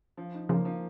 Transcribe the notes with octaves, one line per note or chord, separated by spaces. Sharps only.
F3
D#4
C#3 F3 A#3
F3